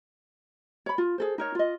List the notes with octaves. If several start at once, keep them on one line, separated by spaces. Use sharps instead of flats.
C#5 B5
F4
G#4 A4 C5
D#4 A#4 C#5
F4 D#5